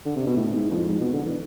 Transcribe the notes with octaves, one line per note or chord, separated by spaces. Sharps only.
D3
C3
B2
A2
G#2
F2
G#2
B2
D3
E3